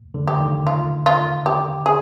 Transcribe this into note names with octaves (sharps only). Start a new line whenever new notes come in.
D3
G4
D#3
F4
F4
G4
G#4